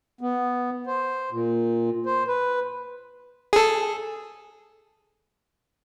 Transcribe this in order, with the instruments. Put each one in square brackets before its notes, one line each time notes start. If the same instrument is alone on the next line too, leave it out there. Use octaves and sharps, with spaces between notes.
[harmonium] B3
C5
A#2
C5
B4
[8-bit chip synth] G#4 A4